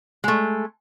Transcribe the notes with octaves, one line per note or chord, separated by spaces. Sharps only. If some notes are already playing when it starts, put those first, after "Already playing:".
G#3 A3